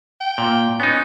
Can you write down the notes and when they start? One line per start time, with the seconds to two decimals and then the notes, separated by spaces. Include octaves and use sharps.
0.21 G5
0.38 A#2
0.80 B3 C#4 D#4